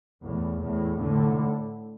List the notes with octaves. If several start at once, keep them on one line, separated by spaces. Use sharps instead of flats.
E2 A2
E2 A2
A2 D3